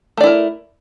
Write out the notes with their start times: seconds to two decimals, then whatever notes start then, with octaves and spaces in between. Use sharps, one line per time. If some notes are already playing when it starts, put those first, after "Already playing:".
0.17 A3
0.21 D5
0.24 E4
0.27 A#4